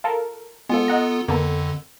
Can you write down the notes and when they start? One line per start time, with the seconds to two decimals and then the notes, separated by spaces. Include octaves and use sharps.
0.04 F4 A4 A#4
0.69 F3 G#3 B3 F4 A4
0.88 D#5 F#5 A#5
1.28 F2 D3 A#3 B3 A4